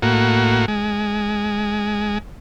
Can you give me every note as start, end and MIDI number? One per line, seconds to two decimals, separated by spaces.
0.02 0.66 45
0.02 0.66 58
0.02 0.66 66
0.68 2.18 56